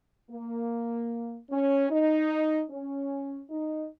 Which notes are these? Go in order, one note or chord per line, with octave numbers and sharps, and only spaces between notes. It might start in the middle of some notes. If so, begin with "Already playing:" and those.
A#3
C#4
D#4
C#4
D#4